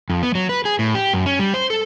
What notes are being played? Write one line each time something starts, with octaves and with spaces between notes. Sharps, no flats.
F2
B3
F#3
B4
G#4
A2
G4
F#2
C#4
G3
C5
A4